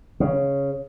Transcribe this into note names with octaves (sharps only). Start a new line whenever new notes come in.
C#3